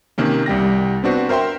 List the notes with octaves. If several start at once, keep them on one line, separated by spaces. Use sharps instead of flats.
C3 D#3 A#3 C#4
C2 G3 G5 A#6
B3 C4 D4 F#4 B4 C5
A#4 C5 E5 G5 C6